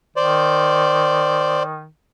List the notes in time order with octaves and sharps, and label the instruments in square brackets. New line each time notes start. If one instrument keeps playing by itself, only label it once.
[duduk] D#3 [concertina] C5 D5